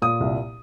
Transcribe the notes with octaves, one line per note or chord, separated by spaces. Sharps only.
A#2 D#6
C2